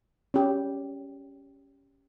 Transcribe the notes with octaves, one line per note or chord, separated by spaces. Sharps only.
C#4 G4